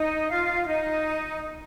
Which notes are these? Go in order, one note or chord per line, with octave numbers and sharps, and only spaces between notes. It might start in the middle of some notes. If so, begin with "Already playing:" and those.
Already playing: D#4 D#5
F4 F5
F5
D#4 D#5